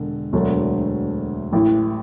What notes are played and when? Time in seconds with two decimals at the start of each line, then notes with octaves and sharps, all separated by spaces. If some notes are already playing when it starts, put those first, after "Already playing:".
Already playing: E1 D3
0.33 E1 D2 D3 F#3 A3
1.53 A1 A2 E3